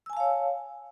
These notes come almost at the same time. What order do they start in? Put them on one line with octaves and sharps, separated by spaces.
E6 G#5 A5 F5 C#5